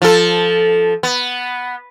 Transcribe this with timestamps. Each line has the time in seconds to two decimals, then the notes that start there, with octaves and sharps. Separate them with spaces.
0.02 F3 A4
1.03 B3